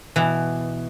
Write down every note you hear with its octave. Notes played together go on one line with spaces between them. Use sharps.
B2 E3